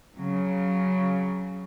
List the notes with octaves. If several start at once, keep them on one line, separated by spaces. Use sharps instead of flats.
C#3 F#3